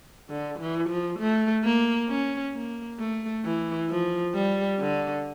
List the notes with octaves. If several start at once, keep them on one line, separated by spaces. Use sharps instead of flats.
D3
E3
F3
A3
A#3
C#4
A#3
A3
E3
F3
G3
D3